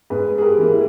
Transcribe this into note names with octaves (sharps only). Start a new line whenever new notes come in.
G#2 G#4 B4
G#4
G4 A#4
E3 A#3
E4